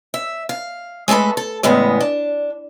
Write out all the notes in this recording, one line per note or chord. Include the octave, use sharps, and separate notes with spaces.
E5
F5
G#3 A3 B3 A4 B4
A4
E2 A2 C#3 G#3 B3
D4